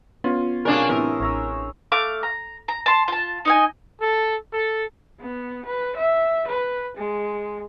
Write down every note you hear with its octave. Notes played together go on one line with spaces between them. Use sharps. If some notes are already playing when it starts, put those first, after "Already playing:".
B3 C#4 F4
B1 C3 A#3 C#4 D4 G#4 A#4
A2 C3 E3 A#4 C#6 D#6 E6
A1 C#5 A#5 E6
A3 F5 D6
A#5
A#5
A5 C6
F4 A5
D#4 D#5 G#5
A4
A4
B3
B4
E5
B4
G#3